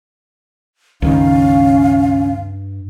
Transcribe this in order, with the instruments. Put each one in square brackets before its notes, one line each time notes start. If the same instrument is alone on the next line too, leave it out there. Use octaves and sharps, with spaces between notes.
[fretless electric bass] C#2 D#3 [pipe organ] G2 [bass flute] C#4 [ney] F5